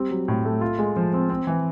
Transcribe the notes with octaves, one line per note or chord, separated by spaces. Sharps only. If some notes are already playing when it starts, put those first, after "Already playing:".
Already playing: G3 C4
F#3
A2
A3
F4
G#3
F3
C4
C4
E3